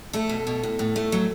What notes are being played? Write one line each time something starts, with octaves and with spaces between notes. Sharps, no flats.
A3 A4
B2
B2
A2
A2
A3
F#3